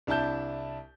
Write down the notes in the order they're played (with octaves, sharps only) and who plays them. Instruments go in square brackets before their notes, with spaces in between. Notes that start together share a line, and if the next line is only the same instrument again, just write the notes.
[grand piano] C2 D4 E4 A5 G6